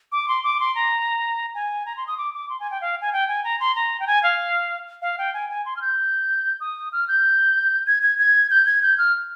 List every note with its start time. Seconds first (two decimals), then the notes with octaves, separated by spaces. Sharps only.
0.12 D6
0.28 C6
0.44 D6
0.60 C6
0.75 A#5
1.55 G#5
1.86 A#5
1.97 C6
2.07 D#6
2.18 D6
2.34 D6
2.49 C6
2.60 G#5
2.71 G5
2.81 F5
3.01 G#5
3.13 G5
3.29 G#5
3.44 A#5
3.60 C6
3.76 A#5
4.00 G5
4.07 G#5
4.23 F5
5.02 F5
5.18 G5
5.34 G#5
5.50 G#5
5.66 C6
5.76 F6
5.82 G6
6.60 D#6
6.93 F6
7.08 G6
7.87 G#6
8.03 G#6
8.19 G#6
8.51 G6
8.66 G#6
8.83 G6
8.98 F6